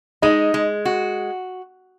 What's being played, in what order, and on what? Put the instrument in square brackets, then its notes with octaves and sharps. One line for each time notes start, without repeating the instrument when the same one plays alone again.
[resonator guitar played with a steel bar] G#3 [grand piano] D#4 D#5
[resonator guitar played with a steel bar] G#3
F#4